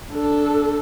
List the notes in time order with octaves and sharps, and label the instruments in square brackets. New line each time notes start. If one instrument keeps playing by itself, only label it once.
[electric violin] D4 A4